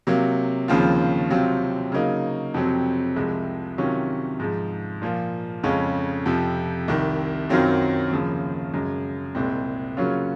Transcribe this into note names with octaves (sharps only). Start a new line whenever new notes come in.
C3 F#3 A#3
D#2 C#3 F3 C4 F4
C3 F#3 C4 F4
C#3 F#3 A#3 D#4
F2 C3 F#3 C4
C2 C3 F3 G#3
C3 D#3 F#3 C#4 F4
G#2 F3 G#3
A#2 F3 A#3
F2 C#3 G#3 C#4 F4
F2 C3 F3
C2 C3 D#3
F#2 D#3 F#3 C4 F4
D#2 C#3 F3
F#2 C#3 G#3
C2 A#2 G#3 C4
C#3 F#3 A#3 C#4 F4